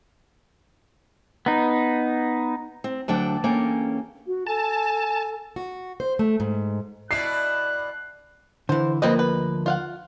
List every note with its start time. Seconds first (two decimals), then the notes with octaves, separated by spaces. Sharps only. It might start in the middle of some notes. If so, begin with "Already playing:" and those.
1.46 B3 D#4
2.84 C4
3.08 D2 F#3 D4 G5
3.44 E2 A#3 C#4 A4 G5
4.26 F#4
4.47 A4 G#5 A5
5.56 F#4
6.00 C5
6.19 A3
6.40 G#2
7.11 B2 E4 D5 F#6 C7
8.69 D3 E3 C5
9.02 D2 F3 A#3 C4 B4 D#5
9.19 B4
9.66 F4 F5 F#5